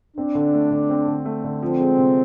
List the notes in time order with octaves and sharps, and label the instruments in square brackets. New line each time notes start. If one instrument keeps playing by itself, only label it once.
[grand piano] C4 [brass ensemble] D4
[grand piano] D3
A3
D3
C4
D3
A3
D3
[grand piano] F3 [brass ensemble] C4
[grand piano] G#3
C3